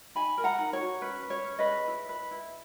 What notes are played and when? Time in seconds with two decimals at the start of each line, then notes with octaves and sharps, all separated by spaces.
0.15 D#4 G#5 B5
0.38 A#4
0.44 F#5 A#5
0.59 D#4
0.73 C#5
0.80 F#4
1.02 C#4 B4
1.23 B4
1.30 C#5
1.44 C#4
1.59 B4 D#5
1.66 G#4
1.88 E4
2.09 B4
2.31 E4